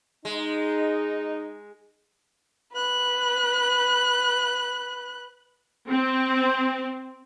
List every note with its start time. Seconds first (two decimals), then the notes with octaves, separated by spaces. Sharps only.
0.25 G#3 D#4
2.73 B4 F#6
5.89 C4